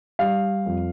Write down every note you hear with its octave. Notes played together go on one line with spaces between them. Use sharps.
G3 F5
F2